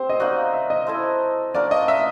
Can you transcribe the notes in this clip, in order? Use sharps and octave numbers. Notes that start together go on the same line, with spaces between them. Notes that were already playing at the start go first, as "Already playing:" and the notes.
Already playing: C4 G4 C5
D#5
A#3 D#4 F#4 D5
E5
D#5
E4 A4 C5
A#3 D4 F#4 A#4 D5
D#5
E5